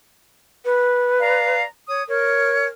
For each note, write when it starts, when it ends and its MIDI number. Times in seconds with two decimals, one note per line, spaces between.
0.65 1.56 71
1.20 1.63 74
1.20 1.63 77
1.20 1.63 82
1.87 2.02 73
1.87 2.02 87
2.08 2.67 70
2.08 2.66 73